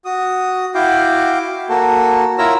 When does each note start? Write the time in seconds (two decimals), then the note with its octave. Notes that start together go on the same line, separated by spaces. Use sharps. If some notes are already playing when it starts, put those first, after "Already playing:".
0.05 F#4 D#6
0.75 E4 F#4 F5 G5 D6
1.69 A#3 F#4 A4
2.38 E4 F4 A#4 C#5 A#5 E6